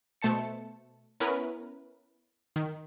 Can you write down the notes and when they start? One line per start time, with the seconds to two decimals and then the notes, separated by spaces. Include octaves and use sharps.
0.22 B2 A3 C5 A5 C#7
1.20 B3 C#4 E4 A#4 B4
2.56 D#3